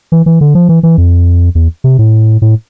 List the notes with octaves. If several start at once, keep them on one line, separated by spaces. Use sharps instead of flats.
E3
E3
D3
F3
E3
E3
F2
E2
C3
A2
A2